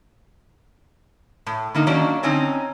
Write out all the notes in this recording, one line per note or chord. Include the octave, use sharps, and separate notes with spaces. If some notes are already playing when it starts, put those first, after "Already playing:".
A2
D3 A#3 D#4
D#3 F#3 A#3 C#4 D4
D3 C4 C#4 D#4